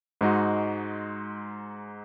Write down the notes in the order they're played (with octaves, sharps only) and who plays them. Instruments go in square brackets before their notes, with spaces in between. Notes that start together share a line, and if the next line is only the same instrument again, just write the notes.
[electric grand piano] G#2 G#3 D#4 F#4